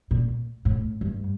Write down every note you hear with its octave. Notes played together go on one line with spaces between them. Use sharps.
A#2
A2
G2